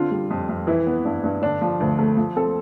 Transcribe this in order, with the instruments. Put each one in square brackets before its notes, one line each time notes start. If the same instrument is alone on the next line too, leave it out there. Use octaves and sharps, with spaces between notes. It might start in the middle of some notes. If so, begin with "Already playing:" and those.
Already playing: [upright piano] D3 C4 F4
G3
F2
F2
E3 E4
B3
G2
G2
D3 D4
F3
D2
A3
F3
C4 A4